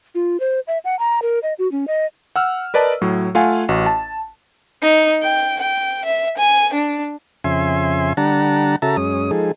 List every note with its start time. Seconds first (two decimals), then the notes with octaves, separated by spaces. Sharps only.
0.15 F4
0.40 C5
0.68 E5
0.85 F#5
0.99 A#5
1.22 A#4
1.43 D#5
1.59 F#4
1.72 C#4
1.88 D#5
2.36 F#5 E6 F6
2.74 A#4 B4 D5 D#5 A5
3.02 A2 F#3
3.35 A3 F4 F5 F#5 G#5
3.69 A1 F#4
3.86 A5
4.83 D#4
5.22 G5
5.60 G5
6.06 E5
6.38 G#5
6.74 D4
7.44 F2 C#3 E5 G#5 C6
8.17 D3 G3 D4 F#5 A5 A#5
8.82 C#3 F#4 A4 E5 A5 A#5
8.97 F#2 G#3 C#4 D#6
9.31 F3 G#3 D#4 G#4 A4